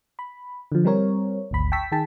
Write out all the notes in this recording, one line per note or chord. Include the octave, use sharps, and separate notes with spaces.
B5
D3 F3
G3 C4 A#4 C#5
G#1 D2 B5
G5 A5 C#6 E6 B6
D#3 G#4 G5 A5 B6